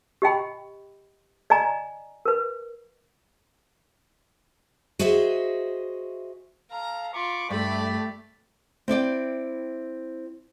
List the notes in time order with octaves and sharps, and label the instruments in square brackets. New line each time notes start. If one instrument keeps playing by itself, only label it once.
[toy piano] G4 D#5 G5 B5
D5 D#5 G#5 A#5
A#4 B4
[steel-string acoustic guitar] F#4 G#4 C5 D#5 E5
[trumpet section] A4 F5 [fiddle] A#5
[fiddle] F4 [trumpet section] B5 C#6 D6
[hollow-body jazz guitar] G2 [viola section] A3 [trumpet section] G4 D5 [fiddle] B5
[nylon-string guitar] C4 E4 D5 G5